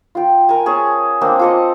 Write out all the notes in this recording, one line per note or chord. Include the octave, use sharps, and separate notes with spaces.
F4 G5
A#4 G#5
C#4 G#4 A5
A#3 C4 D4
F4 A4 D#5